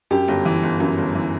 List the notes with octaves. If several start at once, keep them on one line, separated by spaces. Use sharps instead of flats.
F#2 G4
G1
E3
G1
F#2
G1
E3